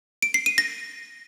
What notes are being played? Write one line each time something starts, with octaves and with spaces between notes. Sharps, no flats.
D7
C7
D#7
A#6